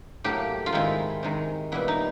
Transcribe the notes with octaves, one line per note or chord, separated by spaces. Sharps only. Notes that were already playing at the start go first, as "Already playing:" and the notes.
A2 F#3 A#3 G4
F4
G#2 D#3 G#3 C4 E4
C3 D#3 G#3
A#2 G3 B3 E4
D#4